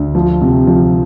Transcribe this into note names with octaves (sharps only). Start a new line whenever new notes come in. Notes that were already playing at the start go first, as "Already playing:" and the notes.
Already playing: D2
F3
C3
F3